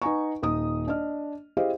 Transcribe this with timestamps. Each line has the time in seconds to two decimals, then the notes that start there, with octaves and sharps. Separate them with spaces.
0.02 D#4 B4 F#5 G#5 A#5 C#6
0.42 D#1 D#4 D#6
0.88 D4 D#5 F6
1.57 E4 G4 G#4 C5 D#5 F5